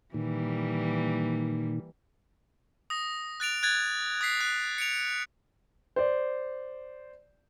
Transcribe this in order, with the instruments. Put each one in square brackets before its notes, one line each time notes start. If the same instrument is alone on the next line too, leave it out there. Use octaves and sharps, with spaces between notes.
[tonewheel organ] A#2 D#3 [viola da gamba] E3 G3 A#3
[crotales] D#6 A#6
F#6 A6 D7 F7
F#6 G#6 A6
D#6 G#6 B6 C7
F#6
C#7 D7 F7
[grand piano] C5 D5